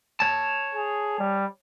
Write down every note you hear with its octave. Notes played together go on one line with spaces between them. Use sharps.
C#5 A5
G#4
G3